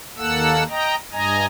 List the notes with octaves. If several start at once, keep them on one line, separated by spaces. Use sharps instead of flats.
D#2 A#3 A4 F#5 E6
D#5 G5 A#5
G2 D#5 G#5 A#5